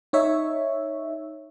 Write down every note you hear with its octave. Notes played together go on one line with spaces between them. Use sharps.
D#4 C#5 E5